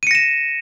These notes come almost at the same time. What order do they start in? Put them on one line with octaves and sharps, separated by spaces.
D#7 C#7 A#6 E7